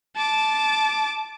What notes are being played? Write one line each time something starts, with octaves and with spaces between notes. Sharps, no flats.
A5 D6